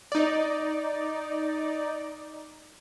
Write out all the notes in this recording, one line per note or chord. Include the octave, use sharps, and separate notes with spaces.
D#4 D5